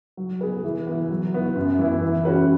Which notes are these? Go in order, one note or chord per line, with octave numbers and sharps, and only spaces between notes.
F#3
B3 G#4 B4
E3
B3 E4
F#3
B3 E4
F#2
E3 B3 E4
E3
G#3 C#4 F#4 B4